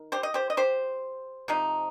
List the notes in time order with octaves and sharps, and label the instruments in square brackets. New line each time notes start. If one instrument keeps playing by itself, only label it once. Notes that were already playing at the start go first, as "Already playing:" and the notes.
Already playing: [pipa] D#3
G4 C5
D#5
G4 C5
D#5
G4 C5
C3 F3 D#4